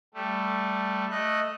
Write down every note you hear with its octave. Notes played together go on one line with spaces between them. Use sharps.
G3 A3
A3 D#5 F#6